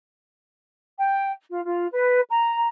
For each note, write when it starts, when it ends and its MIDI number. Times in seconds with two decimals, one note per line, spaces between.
0.98 1.32 79
1.50 1.59 65
1.65 1.86 65
1.92 2.20 71
2.29 2.67 82